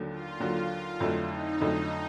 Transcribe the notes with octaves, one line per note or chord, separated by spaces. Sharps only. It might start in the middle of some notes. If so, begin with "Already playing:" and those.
Already playing: D#2 D3 F#3
F4
D#2 D3 F#3
F2 D3 F#3 A3 E4
D#4
F2 D3 F#3 A3 D#4